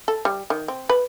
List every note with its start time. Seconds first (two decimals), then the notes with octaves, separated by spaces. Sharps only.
0.08 A4
0.25 G3
0.50 D#3
0.68 C4
0.89 B4